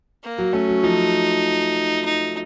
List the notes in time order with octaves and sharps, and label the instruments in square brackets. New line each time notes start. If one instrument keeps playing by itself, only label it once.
[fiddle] A#3
[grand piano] F#3
[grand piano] A3 [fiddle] C#4
[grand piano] F#3
[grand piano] F3 [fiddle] D#4
[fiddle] D#4